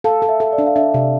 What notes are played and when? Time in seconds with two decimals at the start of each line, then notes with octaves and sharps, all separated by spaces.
0.04 A4 F5 A5
0.22 A4
0.29 E5
0.40 A4
0.53 D5
0.58 D4
0.67 F5
0.76 D4 E5
0.94 C3